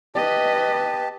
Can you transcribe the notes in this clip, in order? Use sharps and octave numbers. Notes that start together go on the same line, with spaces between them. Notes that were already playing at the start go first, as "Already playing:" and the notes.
G4 B4 D#5 A5